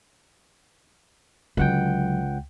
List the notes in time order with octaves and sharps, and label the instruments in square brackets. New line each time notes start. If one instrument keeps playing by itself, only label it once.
[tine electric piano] C#2 F#5 G5 [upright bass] D3 F#3